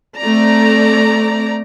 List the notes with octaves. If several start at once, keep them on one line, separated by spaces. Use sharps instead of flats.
A3 C4 D5 A#5